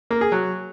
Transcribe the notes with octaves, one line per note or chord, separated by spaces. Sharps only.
A#3
G#4
F#3